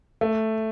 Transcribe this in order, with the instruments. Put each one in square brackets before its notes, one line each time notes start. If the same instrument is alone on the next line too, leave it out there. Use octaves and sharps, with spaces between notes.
[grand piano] A3